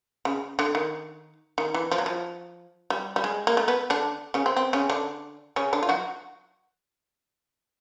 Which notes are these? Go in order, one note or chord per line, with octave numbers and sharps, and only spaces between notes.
C#3
D3
D#3
D#3
E3
F3
F#3
F3
G3
G3
G#3
A#3
A3
B3
D3 D4
C#3 C#4
C4
C4
C#3 C#4
D3 D4
C#3 C#4
D3 D4
F4
F#3 F#4